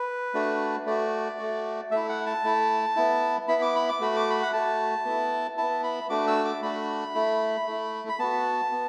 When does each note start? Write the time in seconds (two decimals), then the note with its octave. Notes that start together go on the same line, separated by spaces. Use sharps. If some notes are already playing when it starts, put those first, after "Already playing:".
Already playing: B4
0.34 A3 D4 F#4
0.86 A3 F#4 D5
1.39 A3 F#4
1.91 A3 E4 E5
2.09 F#5
2.26 A5
2.44 A3 E4
2.96 B3 E4
3.48 B3 E4 B5
3.62 D6
3.76 B5
3.89 D6
4.00 A3 F#4 B5
4.16 D6
4.30 B5
4.43 F#5
4.53 A3 F#4 A5
5.05 B3 E4
5.58 B3 E4 A5
5.84 B5
6.10 A3 D4 F#4 D6
6.28 E6
6.45 D6
6.62 A3 D4 F#4 B5
7.15 A3 E4
7.67 A3 E4
8.09 B5
8.19 B3 F#4 A5
8.71 B3